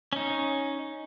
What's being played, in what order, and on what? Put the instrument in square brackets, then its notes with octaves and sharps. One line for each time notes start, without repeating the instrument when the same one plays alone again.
[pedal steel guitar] C#4 D#4